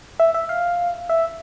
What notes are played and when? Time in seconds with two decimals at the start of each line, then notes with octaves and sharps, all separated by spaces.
0.20 E5
0.34 E5
0.49 F5
1.09 E5